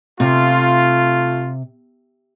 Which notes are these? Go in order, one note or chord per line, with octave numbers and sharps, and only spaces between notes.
C3 A3 F4